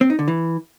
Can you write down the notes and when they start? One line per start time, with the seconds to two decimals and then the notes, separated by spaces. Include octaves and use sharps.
0.01 C4
0.10 D#4
0.19 D3
0.28 E3